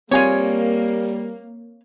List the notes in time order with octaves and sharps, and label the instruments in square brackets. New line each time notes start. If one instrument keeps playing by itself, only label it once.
[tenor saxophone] G3 [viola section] A#3 [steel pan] C4 G#5 [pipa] F4 C#5